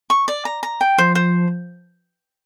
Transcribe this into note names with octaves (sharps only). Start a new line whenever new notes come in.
C#6
D5
A#5
A#5
G5
F3 C5
C5